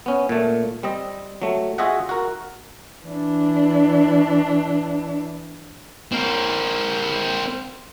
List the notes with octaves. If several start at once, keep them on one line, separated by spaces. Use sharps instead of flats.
B3 C#4
A#2 A3
G3 C4 D#5
F#3 A3
F4 F#4 G#4 D#5 E5 F#5
F#4 A#4
E3 D4
C4 A#4